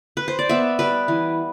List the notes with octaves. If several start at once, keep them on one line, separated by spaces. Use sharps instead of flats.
B4
C5
D5
B3 E5
G3 B4
E3